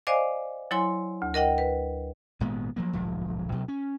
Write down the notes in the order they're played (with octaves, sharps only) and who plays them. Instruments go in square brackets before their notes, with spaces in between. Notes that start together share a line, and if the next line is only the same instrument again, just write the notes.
[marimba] C5 D5 D#5 F5 G#5 D6
F#3 E4 C#5 G#5 C6
D2
A#4 D#5 F#5 G5
B4
[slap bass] G#1 A#2 G#3 B3
F3 F#3 A#3
D1 B1 G#2 F3
D2 B2 F#3
C#4